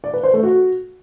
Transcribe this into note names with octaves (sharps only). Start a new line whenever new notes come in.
D5
B4
C5
A3
F#4